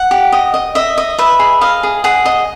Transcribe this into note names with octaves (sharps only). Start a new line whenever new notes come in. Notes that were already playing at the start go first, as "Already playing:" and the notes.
Already playing: F#5
G4
D#5
D#5
D#5 E5
D#5
B4 E5
G#4
D#5 F5
G#4
G#4 F#5
D#5